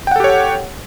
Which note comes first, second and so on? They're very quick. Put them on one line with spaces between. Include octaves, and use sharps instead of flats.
G5 F#5 A4 G4 C#5